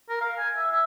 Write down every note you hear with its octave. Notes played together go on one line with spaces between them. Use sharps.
A#4
F5
G#5
E5
E5